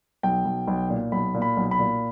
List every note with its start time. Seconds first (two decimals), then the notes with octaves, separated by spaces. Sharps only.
0.23 B1 G5
0.45 B1
0.68 B1
0.90 A#2
1.12 B1 B5
1.34 A#2
1.42 B5
1.57 B1
1.71 B5
1.79 A#2